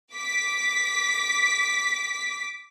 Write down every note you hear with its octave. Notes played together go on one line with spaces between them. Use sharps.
D6 B6